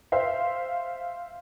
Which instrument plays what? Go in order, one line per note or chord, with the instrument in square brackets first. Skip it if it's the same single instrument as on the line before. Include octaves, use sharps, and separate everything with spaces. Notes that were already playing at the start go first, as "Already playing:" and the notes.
[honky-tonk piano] C5 E5 F5